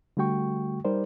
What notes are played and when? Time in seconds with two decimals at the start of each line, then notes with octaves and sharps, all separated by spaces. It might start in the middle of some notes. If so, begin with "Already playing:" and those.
0.17 D3 G3 A3 F#4 G5 C#6
0.85 G3 D#4 G4 A#4 C5 D5